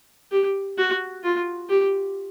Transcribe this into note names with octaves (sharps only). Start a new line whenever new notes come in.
G4
F#4
F4
G4